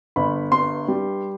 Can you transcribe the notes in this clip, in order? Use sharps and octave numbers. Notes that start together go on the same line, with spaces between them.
G1 B5
G2 C6
G3